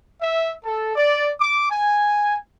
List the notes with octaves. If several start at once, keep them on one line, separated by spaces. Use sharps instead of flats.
E5
A4
D5
D6
G#5